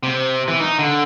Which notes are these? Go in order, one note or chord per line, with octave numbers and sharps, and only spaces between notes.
C3
E3
D#4
D3